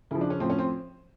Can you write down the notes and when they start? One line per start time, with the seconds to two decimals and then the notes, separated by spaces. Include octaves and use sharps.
0.11 C#3 F3 E4
0.21 D4
0.30 C#4
0.40 A2 F3 C4
0.50 C#4
0.59 C4